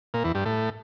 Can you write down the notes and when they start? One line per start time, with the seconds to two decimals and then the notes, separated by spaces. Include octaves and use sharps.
0.14 A#2
0.24 E2
0.35 G2
0.45 A2